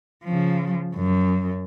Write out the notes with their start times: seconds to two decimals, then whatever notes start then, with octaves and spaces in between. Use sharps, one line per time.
0.24 C#3 F3
0.96 F#2